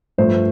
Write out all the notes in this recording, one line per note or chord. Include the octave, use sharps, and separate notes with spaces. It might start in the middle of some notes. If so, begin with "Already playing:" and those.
G2 F3 A3 C5